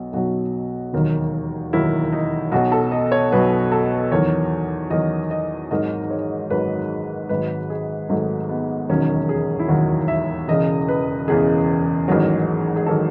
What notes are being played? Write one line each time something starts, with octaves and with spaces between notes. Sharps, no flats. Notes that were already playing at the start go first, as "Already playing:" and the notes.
Already playing: B1 B2 F#3 F#4
B1 B2 F#3 F#4
E1 D#2 D#3 F#3
E1 D#2 D#3 F#3 E4
D#4
B1 B2 F#3 F#4
A4
D#5
C#5
B1 B2 F#3 B4
A4
E2 D#3 F#3 C#5
E2 D#3 F#3 D#5
D#5
G#1 G#2 D#3 F#3 D#5
C#5
G#1 G#2 D#3 F#3 B4
G#1 G#2 F#3 B4
G#4
G#1 G#2 F#3 A3
B3
E1 D#2 D#3 F#3 C#4
G#4
E4
E1 D#2 D#3 F#3 F#4
E5
E1 E2 C#3 D#5
B4
E1 E2 C#3 G#4
A1 G#2 D#3 F#3
G#4
D#3 F#3 A4